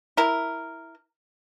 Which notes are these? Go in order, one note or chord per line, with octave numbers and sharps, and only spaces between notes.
E4 A#4